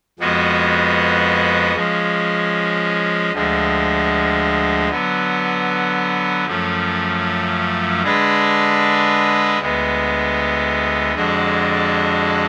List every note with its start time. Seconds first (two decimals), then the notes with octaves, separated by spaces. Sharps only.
0.19 F2 F3 G#3 B3 F#4
1.76 F3 G#3 C#4
3.33 D2 D3 F3 G#3
4.89 D3 F#3 B3
6.46 F#2 F3 A3 C#4
8.02 D3 G#3 D4 G#4 B4
9.58 D2 D3 G#3 B3
11.15 F2 D3 G#3 D4 F#4